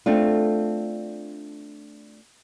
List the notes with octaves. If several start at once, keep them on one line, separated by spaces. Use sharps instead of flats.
A3 C4 D4 F4